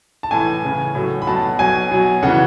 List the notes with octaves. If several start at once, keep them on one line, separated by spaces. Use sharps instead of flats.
A5
A2 E3 G#5
C#3 E3
A2 F#3
B5
B2 F#3 A5
B2 F#3 G#5
B2 F#3
C#3 E3 F#5